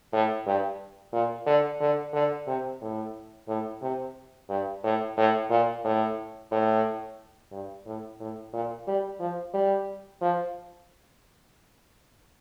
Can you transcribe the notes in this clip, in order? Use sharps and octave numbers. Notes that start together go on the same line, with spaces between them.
A2
G2
A#2
D3
D3
D3
C3
A2
A2
C3
G2
A2
A2
A#2
A2
A2
G2
A2
A2
A#2
G3
F3
G3
F3